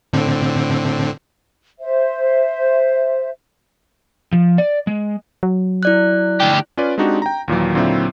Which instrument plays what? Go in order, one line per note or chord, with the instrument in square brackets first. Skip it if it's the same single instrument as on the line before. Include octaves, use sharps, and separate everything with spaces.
[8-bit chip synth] A2 D3 C4
[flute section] C5 E5
[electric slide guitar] F3
D5
G#3
[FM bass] F#3
[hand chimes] E4 D5 F#6
[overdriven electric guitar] D2 G4
[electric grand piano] C#4 F4 B4 D5
G#3 C4 D4 D#4 F#4 G4
G5 A#5
D#2 A#2 E3 F#3
A#2 D3 F#3 C4 E4 E5